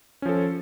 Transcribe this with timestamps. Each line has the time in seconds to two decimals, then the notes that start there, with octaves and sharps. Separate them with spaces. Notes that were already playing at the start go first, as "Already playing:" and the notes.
0.22 C#4
0.26 F3
0.29 A4